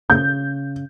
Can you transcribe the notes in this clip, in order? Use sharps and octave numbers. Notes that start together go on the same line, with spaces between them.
C#3 G6